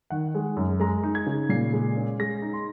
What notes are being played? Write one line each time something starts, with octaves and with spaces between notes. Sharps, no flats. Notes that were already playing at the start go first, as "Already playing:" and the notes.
D#3 F#5
G#3
F#2
G#3 A#5
D#4
G#6
C#3
A#2 C7
G#3
C#4
G#3 A#6
D#4
C6